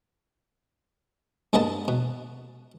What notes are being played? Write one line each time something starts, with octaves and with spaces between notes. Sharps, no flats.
G2 G#3 A#3 B3 D#5 A5
B2